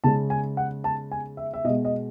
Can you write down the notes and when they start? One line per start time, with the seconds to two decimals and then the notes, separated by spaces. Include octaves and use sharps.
0.04 C#3 G#3 A5
0.30 G#5
0.57 F#5
0.84 A5
1.11 G#5
1.37 E5
1.54 E5
1.64 B2 D#5
1.69 G#3
1.85 D#5